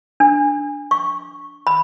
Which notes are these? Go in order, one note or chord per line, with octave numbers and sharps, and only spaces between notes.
D4
C#6
B5